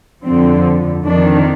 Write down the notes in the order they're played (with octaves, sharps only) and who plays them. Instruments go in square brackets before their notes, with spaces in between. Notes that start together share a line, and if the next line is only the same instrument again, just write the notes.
[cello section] F2 D3 F3 C4
F2 D#3 D4